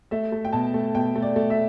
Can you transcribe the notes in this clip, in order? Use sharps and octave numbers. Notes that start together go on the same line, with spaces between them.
A3 E5
A3
G5
B2 A5
A3
B2 G5
A3
D5
A3
E5